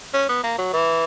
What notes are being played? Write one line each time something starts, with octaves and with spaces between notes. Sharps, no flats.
C#4
B3
A#3
F#3
E3